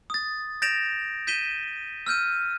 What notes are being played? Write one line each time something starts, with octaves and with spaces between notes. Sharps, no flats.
D#6 A6
G6 A6 A#6 D7 E7 F7
G6 B6 D#7 E7 G7
E6 F6 G6 D#7